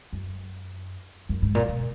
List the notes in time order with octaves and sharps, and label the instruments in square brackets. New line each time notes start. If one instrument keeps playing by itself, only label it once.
[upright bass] F#2
F#2
G#2
A#2
B2